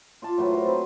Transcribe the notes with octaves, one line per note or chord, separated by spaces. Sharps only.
F4 D5 A5
A2 F#3 B4
A#4 C5
C4 B4